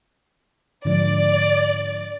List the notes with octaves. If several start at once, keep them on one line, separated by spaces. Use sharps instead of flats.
G#2 D3 F3 D5